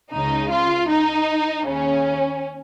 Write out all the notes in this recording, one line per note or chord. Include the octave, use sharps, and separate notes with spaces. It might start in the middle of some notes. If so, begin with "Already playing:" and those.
C#2 C#3 D#4
F4
D#4
D#2 C#3 C#4